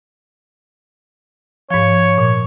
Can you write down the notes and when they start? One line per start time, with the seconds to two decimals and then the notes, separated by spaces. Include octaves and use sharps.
1.70 G#2 F3 C#5
2.18 A#2